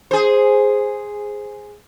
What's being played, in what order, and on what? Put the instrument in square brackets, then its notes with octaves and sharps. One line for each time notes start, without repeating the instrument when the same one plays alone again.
[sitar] G#4 C5